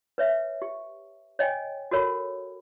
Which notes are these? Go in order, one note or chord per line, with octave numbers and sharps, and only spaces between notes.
B4 C#5 E5
G4
C#5 D#5 G5 G#5
F#4 A4 A#4 C#5 B5